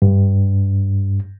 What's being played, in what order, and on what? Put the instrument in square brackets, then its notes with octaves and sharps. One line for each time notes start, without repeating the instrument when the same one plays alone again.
[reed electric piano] G2